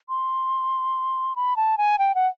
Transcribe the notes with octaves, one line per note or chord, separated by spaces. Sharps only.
C6
B5
A5
G#5
G5
F#5